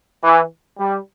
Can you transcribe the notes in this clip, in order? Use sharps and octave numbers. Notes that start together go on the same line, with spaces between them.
E3
G3